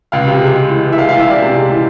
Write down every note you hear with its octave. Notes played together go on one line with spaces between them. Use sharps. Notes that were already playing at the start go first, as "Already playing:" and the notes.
C#2 F5
C3
G#3
G#3
E3
E3
E5
G#3 F5
E3 F5
E5
G#3 D5
C3
G#3
E3